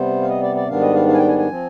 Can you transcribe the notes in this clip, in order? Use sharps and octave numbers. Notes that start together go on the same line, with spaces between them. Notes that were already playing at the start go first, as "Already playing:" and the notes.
Already playing: C3 G3 B3 C5
F5
D#5
D5
D5
G#2 D#3 G3 B3 D4 F5
D#5
F5
F5
G#5
G5
G#5
G#5
F3 C4